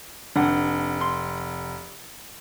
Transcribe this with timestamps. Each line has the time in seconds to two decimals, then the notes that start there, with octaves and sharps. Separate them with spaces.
0.36 F1 D4 F#5
1.01 C6